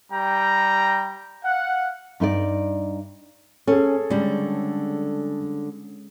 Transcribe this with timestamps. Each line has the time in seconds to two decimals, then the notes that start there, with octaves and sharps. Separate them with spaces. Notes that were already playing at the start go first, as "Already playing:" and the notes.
0.11 G3 G5 A#5
1.44 F5 F#5
2.20 G2 D#4 B4 D5
3.67 C#4 G#4 A4
4.10 D3 G3 G#3 C#4